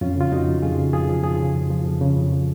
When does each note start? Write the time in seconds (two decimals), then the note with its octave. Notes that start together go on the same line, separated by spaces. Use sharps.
0.01 F2 C#4 F4
0.16 C#3 F4
0.32 F2 D#4 F#4
0.47 F3
0.62 F2 F4 G#4
0.78 C#3
0.93 F2 F4 G#4
1.09 F3
1.23 F2 F4 G#4
1.40 C#3
1.55 F2
1.71 F3
1.86 F2
2.01 C#3
2.17 F2
2.32 F3